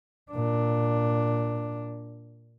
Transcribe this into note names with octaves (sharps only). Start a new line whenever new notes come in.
A#2 D4